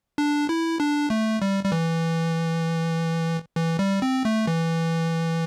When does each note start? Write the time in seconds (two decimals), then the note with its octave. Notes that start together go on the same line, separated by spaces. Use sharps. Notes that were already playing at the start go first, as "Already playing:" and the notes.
0.18 D4
0.49 E4
0.80 D4
1.10 A3
1.42 G3
1.64 G3
1.72 E3
3.56 E3
3.79 G3
4.02 C4
4.25 A3
4.47 E3